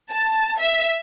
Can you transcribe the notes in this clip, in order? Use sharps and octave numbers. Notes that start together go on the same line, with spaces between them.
A5
E5